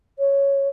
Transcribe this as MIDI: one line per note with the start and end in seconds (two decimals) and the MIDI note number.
0.19 0.69 73